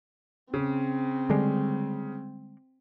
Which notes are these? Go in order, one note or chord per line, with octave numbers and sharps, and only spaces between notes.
C#3 C4
D3 G3 G#3